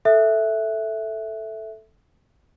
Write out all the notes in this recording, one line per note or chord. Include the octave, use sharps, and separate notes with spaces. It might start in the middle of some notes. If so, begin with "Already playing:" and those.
A4 E5 F#6